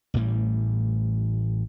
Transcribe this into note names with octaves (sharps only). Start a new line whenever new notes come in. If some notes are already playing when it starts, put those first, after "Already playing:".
A1 A2 E3 G3